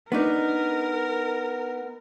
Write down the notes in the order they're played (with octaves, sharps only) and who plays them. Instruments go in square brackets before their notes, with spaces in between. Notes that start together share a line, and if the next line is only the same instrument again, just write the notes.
[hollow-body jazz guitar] B3 D4 D#4 [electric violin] A#4